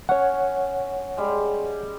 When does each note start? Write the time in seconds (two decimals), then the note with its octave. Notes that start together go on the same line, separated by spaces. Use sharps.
0.09 C#4 C#5 F#5
1.17 G3 G#3